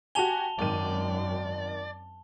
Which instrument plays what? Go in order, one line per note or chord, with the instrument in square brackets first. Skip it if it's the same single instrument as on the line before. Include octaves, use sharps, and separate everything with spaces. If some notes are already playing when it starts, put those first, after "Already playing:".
[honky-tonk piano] F#4 G4 G#5 [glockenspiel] A5 F7 G7
[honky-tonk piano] G#1 D#3 D#7 [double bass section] F#2 [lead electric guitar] D5